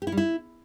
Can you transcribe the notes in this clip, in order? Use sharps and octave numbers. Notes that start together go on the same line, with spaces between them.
G4
E4
G3
E4